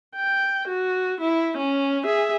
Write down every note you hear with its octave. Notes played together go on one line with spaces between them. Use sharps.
G5
F#4
E4
C#4
G#4 E5